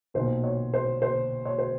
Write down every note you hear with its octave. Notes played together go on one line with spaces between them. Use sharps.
B1 A#2 C5
C#5
C5
C5
C#5
C5